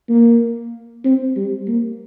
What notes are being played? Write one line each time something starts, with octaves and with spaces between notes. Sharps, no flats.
A#3
C4
G3
A#3